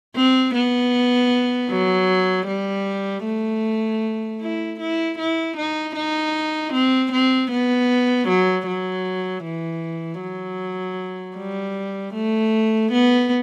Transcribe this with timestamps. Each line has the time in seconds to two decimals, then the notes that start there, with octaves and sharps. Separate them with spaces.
0.16 C4
0.54 B3
1.70 F#3
2.48 G3
3.25 A3
4.41 E4
4.80 E4
5.19 E4
5.57 D#4
5.96 D#4
6.73 C4
7.12 C4
7.51 B3
8.28 F#3
8.66 F#3
9.44 E3
10.21 F#3
11.37 G3
12.14 A3
12.92 B3